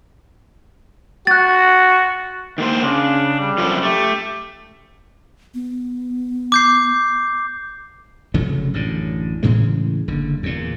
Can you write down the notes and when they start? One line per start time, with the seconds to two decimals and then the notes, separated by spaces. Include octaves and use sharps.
1.27 F#4 F#6 A6
2.58 D#3 A#3 C5
2.83 C#3 D4
3.39 G3
3.58 F#2 F3 A4
3.83 A3 G4
5.54 B3
6.52 D6 G6 C7
8.34 F1 C#3 F#3 A3
8.74 A1 F#2 D3
9.43 A2 C#3 E3 G#3
10.08 F#1 D3
10.43 E2 A#2